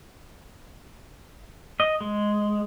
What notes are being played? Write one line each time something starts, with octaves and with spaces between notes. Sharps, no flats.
D#5
G#3